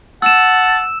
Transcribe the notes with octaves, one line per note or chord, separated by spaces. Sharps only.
F#5 A5 E6 E7